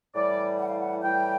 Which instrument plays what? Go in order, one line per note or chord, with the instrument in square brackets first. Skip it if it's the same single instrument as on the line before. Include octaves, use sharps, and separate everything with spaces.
[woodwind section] A2 E3 G3 D5
F#5
F5
F#5
A2 E3 G3 G5